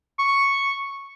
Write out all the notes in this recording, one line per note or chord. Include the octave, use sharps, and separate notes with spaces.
C#6